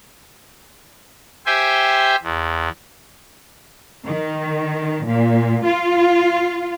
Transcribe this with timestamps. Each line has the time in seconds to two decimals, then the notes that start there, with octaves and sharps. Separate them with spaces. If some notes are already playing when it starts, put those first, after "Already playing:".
1.46 G4 C5 E5 G5 G#5
2.23 E2
4.06 D#3
5.07 A#2
5.66 F4